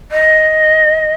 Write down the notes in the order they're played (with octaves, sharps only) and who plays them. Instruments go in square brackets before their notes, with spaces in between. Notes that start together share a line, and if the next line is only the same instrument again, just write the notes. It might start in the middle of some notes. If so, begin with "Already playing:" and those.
[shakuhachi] D#5